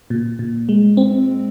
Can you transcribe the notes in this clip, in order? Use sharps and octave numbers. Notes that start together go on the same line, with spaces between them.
A#2
A#2
G#3
C4